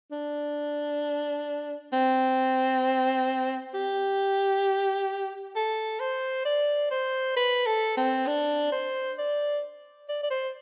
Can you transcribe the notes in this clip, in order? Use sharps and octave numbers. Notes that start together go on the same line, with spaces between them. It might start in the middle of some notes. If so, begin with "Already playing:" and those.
D4
C4
G4
A4
C5
D5
C5
B4
A4
C4
D4
C5
D5
D5
D5
C5